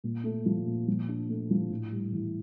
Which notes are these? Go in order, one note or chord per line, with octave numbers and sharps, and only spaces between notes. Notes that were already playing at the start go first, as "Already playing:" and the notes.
A#2
A3
F3
A#2
F3
D4
A3
F3
A2
G3
E3